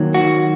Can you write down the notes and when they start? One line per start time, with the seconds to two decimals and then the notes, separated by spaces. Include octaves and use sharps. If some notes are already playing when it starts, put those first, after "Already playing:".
Already playing: D#3 F#3 A#3
0.14 F#4